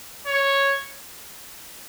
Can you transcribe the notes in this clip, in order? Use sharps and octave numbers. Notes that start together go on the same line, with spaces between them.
C#5